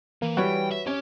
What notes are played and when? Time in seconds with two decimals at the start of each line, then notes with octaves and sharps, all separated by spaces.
0.22 E3 A#3
0.37 E3 G3 F#4 B4 C#5 G5
0.71 E5
0.87 C#4 G4 C#5